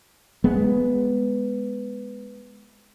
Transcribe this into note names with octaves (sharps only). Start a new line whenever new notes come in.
G#3 B3